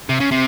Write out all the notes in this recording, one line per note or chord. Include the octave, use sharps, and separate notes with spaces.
C3
C#3
C3